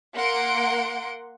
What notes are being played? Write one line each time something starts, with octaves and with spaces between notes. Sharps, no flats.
A#3 F#5 C6 D7